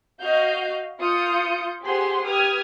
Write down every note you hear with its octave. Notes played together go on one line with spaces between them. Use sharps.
F#4 D#5 F5 G6
F4 D#6 G6 C#7
G4 G#4 C5 F#5 C6
G4 B4 D#6 F6 G#6